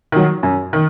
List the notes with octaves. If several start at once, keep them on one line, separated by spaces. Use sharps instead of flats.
D#3 F#3
F#2
D#3